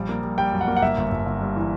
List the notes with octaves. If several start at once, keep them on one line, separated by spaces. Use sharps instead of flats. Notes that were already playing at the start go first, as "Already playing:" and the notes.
Already playing: A#1 G3
A#3
G3
G3 G5
F#2
F#5
A#3
F#5
G1 E5
G1
G1
G1
G2
E3